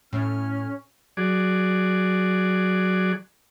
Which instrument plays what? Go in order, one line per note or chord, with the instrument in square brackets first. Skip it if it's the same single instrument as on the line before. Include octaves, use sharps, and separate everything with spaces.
[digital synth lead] A2 [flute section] C#4 F6
[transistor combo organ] F#3 G#4 D5